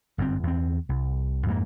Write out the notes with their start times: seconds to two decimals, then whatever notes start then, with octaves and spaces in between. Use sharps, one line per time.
0.18 G1 F#2 C3 C4
0.43 E2 C4
0.89 C2
1.46 F2 G#2 A3 A#3